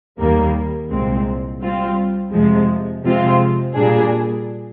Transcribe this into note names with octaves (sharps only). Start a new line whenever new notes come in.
D#2 D#3 G3 A#3
C2 A#2 G#3 C4
G3 C4 F4
F2 C3 F3 G#3
C3 F3 G#3 C4 F4
A#2 G3 D4 G#4